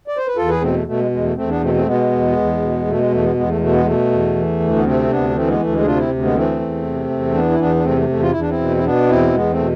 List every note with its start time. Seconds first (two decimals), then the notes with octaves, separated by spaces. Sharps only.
0.08 D5
0.17 C5
0.27 B4
0.36 E2 F4 A4
0.49 G#4 B4
0.61 B2 A3 C4
0.74 A3
0.86 B2 A3
0.99 G#3
1.11 E2 G#3
1.24 A3
1.36 E2 A3 C4
1.49 B3 D4
1.61 B2 A3 C4
1.74 A3 C4
1.86 B2 G#3 B3
2.11 E2
2.36 E2
2.61 B2
2.86 B2 A3
2.99 G#3
3.11 E2 A3
3.23 G#3 B3
3.35 E2 G#3 B3
3.48 A3
3.57 G#3
3.60 B2 A3
3.73 G#3 B3
3.85 B2 A3
4.11 E2
4.36 E3
4.60 D2
4.76 B3
4.85 C3 A3 C4
5.10 D2 B3 D4
5.30 B3
5.35 E3 A3 C4
5.48 G#3 B3
5.59 D2 A3
5.73 G#3
5.81 G#4
5.84 C3 D4 F4
5.97 C4 E4
6.10 D2
6.22 G#3 B3
6.35 E3 A3 C4
6.60 E2
6.85 C3
7.10 E2
7.34 E3 B3 D4
7.50 E4
7.59 E2 B3 D4
7.76 D4
7.84 C3 A3 C4
7.97 A3
8.09 E2 A3
8.22 F4
8.31 E2 E4
8.40 D4
8.49 C4 E4
8.59 B2
8.77 E4
8.83 B2 B3 D4
9.09 E2 C4 E4
9.34 E2 G#3 B3
9.50 A3 C4
9.59 B2